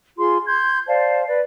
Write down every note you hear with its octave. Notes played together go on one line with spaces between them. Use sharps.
F4 G#4 C6
C6 G6 G#6
C5 D5 F5 A5
B4 D5